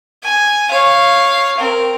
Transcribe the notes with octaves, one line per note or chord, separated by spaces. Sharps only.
G#5
C#5 F5
C4 A#4